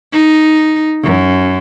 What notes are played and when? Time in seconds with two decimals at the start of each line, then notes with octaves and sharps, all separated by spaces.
0.13 D#4
1.03 F#2